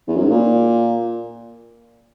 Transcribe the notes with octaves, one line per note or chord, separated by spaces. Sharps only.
E2
F#2
G#2
A#2